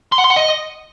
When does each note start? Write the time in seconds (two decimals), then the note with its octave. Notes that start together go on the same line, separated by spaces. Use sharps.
0.12 C6
0.18 F#5
0.24 C6
0.30 F#5
0.36 D#5